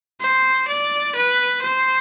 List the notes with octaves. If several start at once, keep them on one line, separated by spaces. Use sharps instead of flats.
C5
D5
B4
C5